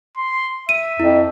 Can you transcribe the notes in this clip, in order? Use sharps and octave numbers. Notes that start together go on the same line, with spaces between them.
C6
E5 D#7
F2 E4